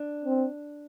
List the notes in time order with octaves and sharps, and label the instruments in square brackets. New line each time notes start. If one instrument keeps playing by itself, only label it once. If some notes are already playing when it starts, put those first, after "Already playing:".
Already playing: [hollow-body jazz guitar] D4
[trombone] C4